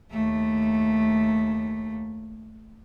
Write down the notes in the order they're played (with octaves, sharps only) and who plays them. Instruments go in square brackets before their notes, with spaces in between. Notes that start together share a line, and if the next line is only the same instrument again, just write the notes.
[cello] D#2 A3